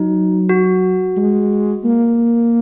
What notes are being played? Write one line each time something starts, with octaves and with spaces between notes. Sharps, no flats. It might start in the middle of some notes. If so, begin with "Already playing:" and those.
Already playing: F#3 D#4
F#4
G#3
A#3